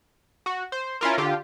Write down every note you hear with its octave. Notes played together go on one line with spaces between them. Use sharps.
F#4
C5
C#4 E4 F4 A#4
D3 F4 G4